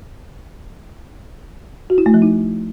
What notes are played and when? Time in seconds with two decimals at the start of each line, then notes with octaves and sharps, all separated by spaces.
1.90 F#4
1.98 E4
2.06 A3
2.14 F3
2.22 D#4